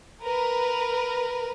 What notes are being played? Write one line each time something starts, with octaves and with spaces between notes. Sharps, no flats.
A#4 B4